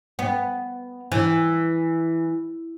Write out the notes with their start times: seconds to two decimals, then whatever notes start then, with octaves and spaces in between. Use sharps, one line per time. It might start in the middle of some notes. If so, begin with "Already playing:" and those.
0.19 B3
1.12 E3